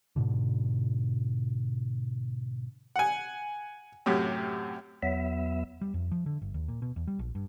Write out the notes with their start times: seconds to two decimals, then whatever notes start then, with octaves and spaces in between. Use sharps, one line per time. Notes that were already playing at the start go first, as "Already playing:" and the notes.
0.16 G#2 B2 D3
2.96 F#5 G#5
4.06 F#2 A2 C3
5.03 E2 F#3 B3 E5
5.81 G3
5.94 F2
6.11 F3
6.26 D3
6.42 G1
6.54 D#2
6.68 A#2
6.82 B2
6.96 E2
7.07 G3
7.19 A#1
7.35 G2